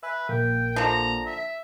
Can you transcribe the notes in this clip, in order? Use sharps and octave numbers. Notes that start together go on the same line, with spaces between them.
B4 E5 G#5
A#1 A#3 G5
D3 F3 A#5
E5